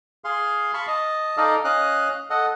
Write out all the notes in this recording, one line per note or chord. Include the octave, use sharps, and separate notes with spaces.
G#4 F5 C6
F5 A5 B5 C#6
D#5 A5
D#4 A4 D5 D#5 F5
C#4 D#5 F5 F#6
A4 D#5 F#5